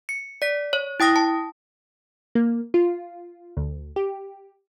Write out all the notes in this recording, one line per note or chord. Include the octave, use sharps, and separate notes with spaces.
C#7
D5 B6
C#5
E4 G5 D#6 A#6
A5
A#3
F4
D2
G4